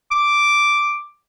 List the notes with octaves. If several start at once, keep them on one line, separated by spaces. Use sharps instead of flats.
D6